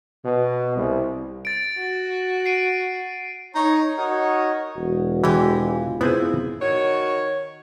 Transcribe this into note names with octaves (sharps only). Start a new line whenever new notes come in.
B2
C2
A6 D7
F#4
C7 D7 D#7
D#4 C#5
D#4 F#4 A#4 C#5 D#5
E1 F#4
E3 G#3 G4
F4
B3 C4 E4 G#4
D#3 F#4 C#5